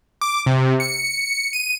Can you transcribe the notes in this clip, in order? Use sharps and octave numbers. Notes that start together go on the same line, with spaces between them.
D6
C3
C#7
D#7